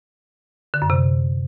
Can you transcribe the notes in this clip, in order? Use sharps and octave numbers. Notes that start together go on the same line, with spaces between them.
D3
F#2
C3